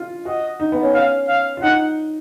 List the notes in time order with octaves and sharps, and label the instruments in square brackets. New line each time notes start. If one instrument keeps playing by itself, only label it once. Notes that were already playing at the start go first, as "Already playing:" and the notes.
Already playing: [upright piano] F4
[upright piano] F#4 [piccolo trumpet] D#5
[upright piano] D#4
B3
C#4
[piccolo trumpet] F5
F5
[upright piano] F4
[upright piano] D#4 [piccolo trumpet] F#5